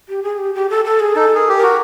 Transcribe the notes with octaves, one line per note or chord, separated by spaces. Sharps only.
G4
G#4
G4
G4
A4
A4
G#4
D#4 A4
G#4 A#4
G4
A#4
F#4